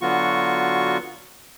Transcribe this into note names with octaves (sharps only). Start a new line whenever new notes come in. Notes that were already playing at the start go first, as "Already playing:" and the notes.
D3 F#3 B3 F4 F#4 C#6